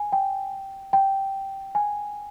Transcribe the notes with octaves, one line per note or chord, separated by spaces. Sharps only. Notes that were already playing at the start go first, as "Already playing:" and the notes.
Already playing: G#5
G5
G5
G#5